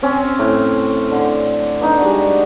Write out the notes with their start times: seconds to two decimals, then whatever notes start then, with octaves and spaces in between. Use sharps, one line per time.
0.02 C4 C#4
0.39 A2
1.11 D3
1.81 B3 D4 D#4
2.00 G3 G#3 F#4